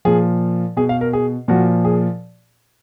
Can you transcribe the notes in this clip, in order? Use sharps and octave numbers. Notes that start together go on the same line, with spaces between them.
A#2 F3 G#4
B2 G#4
F5
A#4
G#4
A#2 F3 F#4
G#4